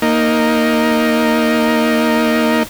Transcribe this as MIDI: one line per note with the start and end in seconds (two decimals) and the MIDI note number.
0.02 2.63 58
0.02 2.63 63